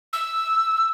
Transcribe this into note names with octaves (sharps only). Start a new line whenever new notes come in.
E6